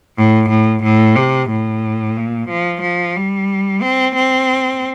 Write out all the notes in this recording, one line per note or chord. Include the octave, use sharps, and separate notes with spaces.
A2
A2
A2
C3
A2
A#2
F3
F3
G3
C4
C4